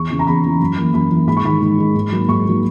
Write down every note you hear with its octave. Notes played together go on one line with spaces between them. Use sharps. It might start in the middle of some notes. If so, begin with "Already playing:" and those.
Already playing: E2 C#6
C#3 E3
A#5
E2 B5
C#3 E3
F#2
E3 A#3
F#2 B5
E3 A#3
G#2 B5
C#6
D#3 G#3 B5
G#2
D#3 G#3
G#2
F#3 A#3
G#2 C#6
F#3 A#3